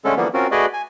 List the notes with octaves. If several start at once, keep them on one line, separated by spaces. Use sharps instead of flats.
D3 G#3 A3 C#4 A4
D3 E3 F3 G3 A#3 B3
C4 C#4 F4 F#4 A#4
A3 F#4 G#4 B4 D5 D#5
G#5